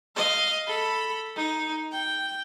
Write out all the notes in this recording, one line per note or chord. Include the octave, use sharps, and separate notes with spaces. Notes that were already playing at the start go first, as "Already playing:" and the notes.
D#5 F5
A4 B5
D#4
G5